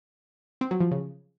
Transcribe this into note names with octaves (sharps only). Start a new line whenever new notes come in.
C4
F#3
F3
C#3